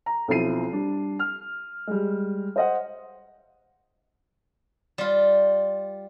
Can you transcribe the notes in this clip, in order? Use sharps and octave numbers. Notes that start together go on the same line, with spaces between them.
A#5
B1 F3 C4 E4 C7 D#7
G3 D4
F6
G3 G#3
C5 D#5 F#5
G3 F4